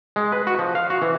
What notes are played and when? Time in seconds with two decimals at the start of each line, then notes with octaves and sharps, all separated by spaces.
0.16 G#3
0.32 B4
0.47 F#4
0.59 F3
0.75 F5
0.90 F#4
1.02 E3